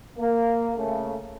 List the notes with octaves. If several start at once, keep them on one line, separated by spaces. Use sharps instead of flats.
A#3
C#3 A3